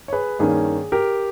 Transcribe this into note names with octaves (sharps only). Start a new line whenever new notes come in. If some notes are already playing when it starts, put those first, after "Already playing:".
C#5
G#4 B4
G2 D#3 A#3 C#4 G#4
G4 A#4